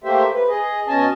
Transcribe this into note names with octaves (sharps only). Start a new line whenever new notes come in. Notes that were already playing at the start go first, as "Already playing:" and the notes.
A3 A#3 G4 C5 E5
B4
G#4 D#5
B2 C#4 D#5 G#5 A5